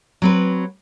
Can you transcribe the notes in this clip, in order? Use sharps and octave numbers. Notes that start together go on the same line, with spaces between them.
F#3 C4 B4